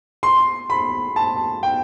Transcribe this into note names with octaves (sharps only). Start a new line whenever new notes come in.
C6
B5
A5
G5